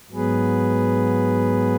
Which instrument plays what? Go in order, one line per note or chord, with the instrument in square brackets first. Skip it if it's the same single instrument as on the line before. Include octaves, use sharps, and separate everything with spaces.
[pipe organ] G#2 F#3 B3 G#4 B4